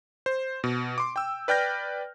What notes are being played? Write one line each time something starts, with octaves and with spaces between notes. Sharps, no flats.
C5
B2
C6 D6
G5 E6
B4 D5 G5 F6 G6 A#6